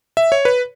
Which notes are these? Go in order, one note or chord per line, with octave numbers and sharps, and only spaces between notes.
E5
C#5
B4